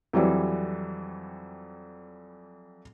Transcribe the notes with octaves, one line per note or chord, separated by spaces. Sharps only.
F2 E3 F#3 G3